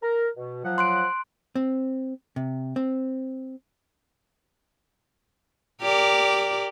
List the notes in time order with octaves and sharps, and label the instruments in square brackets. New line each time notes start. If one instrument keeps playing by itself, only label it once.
[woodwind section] A#4
B2
F3 F#3 F#5
[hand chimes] C6 F#6 D7
[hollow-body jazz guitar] C4
C3
C4
[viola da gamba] G4 A#4 D5